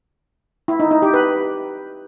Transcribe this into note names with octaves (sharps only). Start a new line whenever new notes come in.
E4
D#4
D#4
G4
B4